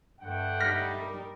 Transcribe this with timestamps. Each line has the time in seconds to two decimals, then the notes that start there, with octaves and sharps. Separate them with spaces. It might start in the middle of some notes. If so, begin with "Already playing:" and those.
0.21 G2 D3 A3 F#5 G5
0.60 G3 D#4 F6 A#6 B6
1.00 A#4